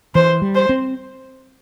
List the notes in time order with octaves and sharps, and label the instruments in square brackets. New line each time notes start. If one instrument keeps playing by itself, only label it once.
[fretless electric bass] E3 [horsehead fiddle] C5
[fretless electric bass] G3
[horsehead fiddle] C5
[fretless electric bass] C4